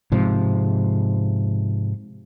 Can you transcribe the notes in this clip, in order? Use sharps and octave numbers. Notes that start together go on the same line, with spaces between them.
G#2 C3 F3